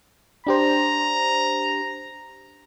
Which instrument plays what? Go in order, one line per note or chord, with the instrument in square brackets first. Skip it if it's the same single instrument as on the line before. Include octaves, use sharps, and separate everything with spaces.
[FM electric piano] D4 G4 C5 [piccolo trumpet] A#5